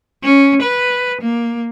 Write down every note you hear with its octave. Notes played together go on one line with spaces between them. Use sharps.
C#4
B4
A#3